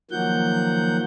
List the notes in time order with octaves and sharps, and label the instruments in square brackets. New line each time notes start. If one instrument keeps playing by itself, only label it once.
[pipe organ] D#3 F3 F#3 A#3 F#5 G6